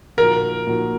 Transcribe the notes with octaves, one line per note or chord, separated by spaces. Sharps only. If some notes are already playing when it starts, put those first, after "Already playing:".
A#2 F3 A#3 D#4 F#4 A#4
A#2 F3 A#3 D#4 F#4